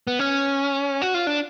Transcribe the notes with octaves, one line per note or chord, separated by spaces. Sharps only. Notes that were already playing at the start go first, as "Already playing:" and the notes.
B3
C#4
F#4
F4
D4